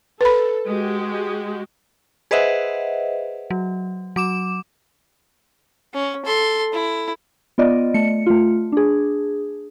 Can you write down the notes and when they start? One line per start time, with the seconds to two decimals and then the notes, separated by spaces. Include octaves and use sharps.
0.21 A4 B4 B5
0.66 G#3 F#4 G4
2.31 G#4 B4 C5 D#5 E5 F#5
3.50 F#3
4.16 F#3 D6 E7
5.94 C#4
6.25 A4 C6
6.73 E4
7.58 B3 F4 D5 D#5
7.94 A3 C#7
8.26 A3 F4
8.72 D4 G#4